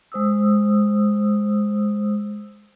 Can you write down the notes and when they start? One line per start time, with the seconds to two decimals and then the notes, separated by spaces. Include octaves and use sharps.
0.12 G#3 C5 D#6 E6